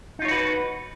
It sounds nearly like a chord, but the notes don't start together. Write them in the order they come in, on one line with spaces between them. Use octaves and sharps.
D#4 F4 C#5 F#4 B4